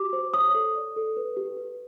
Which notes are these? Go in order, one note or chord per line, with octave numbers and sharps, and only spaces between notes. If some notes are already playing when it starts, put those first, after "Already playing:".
Already playing: F#4 G4 D6
C5
C#5 D#6
A4
D5
A4
B4
G4
B4